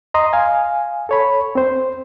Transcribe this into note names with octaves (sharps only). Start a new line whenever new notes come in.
D#5 A#5 C6 D#6
F5 G#5
A4 C#5 B5
C4 C5